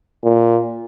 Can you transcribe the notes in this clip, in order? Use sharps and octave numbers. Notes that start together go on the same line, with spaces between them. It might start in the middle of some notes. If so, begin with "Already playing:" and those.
A#2